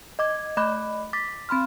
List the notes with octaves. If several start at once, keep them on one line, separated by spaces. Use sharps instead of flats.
D#5 D6 G#6
A3 D#5 B5 D6 F#6
D6 A6 B6
C4 B5 C6 F6